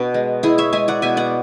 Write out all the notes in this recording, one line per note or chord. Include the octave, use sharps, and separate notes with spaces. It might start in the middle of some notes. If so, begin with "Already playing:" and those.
Already playing: B2 B3 D4
G#3
G#3 E4 G#4
C#5 E5
G#3 E5 G#5
D5 F#5
B2 E5 G#5
D5 F#5